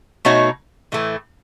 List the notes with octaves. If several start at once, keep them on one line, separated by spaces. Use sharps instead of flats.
B2 A3 D#4 F#4 C#5
A2 E3 A3